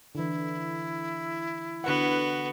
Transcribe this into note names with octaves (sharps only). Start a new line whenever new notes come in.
D3 E3 E4
D3 B3 F#4 B4 F#5